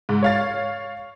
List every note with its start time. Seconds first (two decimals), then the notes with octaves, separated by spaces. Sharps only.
0.09 G#2
0.23 C#5 F5 A6